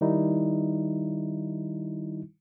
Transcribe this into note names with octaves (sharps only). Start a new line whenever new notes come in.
D#3 G3 D#4 E4